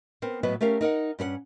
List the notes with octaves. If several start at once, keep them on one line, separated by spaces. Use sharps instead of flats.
B3 C4 A#4
A2 F#3 B3 B4 D#5
A3 C#4 G4 A#4 F5
D#4 A#4 D#5 F#5
G2 C#4 A#4 F#5